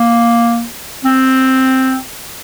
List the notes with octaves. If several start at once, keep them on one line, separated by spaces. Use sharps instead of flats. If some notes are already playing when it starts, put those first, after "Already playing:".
Already playing: A#3
C4